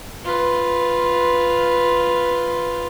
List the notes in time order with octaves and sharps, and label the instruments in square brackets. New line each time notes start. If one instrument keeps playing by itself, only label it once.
[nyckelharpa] F4 B4